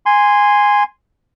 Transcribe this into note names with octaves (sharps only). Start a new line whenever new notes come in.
G#5 C6